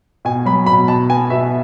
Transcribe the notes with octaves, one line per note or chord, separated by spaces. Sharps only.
B2 G#5
F#3 B5
B2 B5
B2 A5
B3 G#5
B2 E5